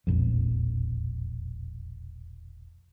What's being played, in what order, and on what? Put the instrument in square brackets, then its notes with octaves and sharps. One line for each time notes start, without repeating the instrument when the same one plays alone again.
[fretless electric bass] E1 A#1 F2